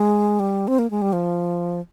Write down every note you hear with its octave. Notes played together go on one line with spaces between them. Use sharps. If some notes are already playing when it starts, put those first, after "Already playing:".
Already playing: G#3
G3
C4
A#3
G#3
G3
F3